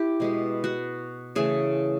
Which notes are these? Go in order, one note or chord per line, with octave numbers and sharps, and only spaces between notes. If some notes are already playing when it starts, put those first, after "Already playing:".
Already playing: E4 G4
B2 G#3 B3
F#4
C#3 E3 A3 G#4